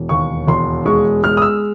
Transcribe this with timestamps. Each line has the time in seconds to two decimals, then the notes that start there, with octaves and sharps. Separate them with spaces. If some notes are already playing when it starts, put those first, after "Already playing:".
Already playing: E1
0.09 D#2 C#6
0.47 E1 C6
0.86 G#3 C#6
1.23 G#3 F6
1.37 D#6
1.42 E6